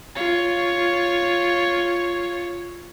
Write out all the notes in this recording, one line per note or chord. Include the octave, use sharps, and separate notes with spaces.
F4 C#5